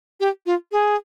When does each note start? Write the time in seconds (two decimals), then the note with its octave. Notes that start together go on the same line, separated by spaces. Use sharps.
0.20 G4
0.46 F4
0.72 G#4